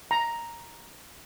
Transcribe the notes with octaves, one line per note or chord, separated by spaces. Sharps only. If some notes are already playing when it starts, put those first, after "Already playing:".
A#5